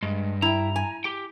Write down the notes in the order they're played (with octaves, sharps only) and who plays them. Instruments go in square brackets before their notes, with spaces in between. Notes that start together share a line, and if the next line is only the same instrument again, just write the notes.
[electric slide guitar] G2 [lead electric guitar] G#3
[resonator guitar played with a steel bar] E4 G5 [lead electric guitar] A#5
[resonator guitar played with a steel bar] G#5
[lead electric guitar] G4 G5